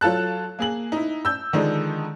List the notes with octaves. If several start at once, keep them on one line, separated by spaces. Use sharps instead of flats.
F#3 F4 A4 A5 F#6
A#3 G#4 F#7
D#4 E4
E6 G6
D3 D#3 F3 G#3 D4 D#4